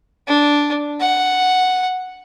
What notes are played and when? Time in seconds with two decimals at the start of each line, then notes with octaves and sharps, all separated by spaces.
0.27 D4
1.01 F#5